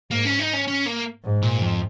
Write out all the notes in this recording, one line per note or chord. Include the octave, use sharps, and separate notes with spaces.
G#2 A#3
C#4
D#4
C#4
C#4
A#3
G#2
A#2
F2